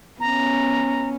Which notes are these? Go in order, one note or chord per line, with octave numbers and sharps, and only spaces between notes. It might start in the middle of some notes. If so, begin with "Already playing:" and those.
B3 C#4 A#5